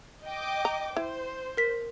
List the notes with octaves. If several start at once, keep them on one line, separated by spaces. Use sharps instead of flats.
D#5 G5 D6
A#5
E4 C5
A#4 B6